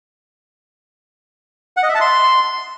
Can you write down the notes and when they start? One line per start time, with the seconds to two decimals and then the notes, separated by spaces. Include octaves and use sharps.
1.77 F#5
1.83 D#5
1.89 E5
1.95 A5
2.01 C6